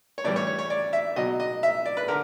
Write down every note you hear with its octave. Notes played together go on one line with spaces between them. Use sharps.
C#5
A2 E3 G3 D5
C#5
C#5
C#5
D5
E5
B2 F#3 D#5
D#5
E5
D5
B4
D3 A#4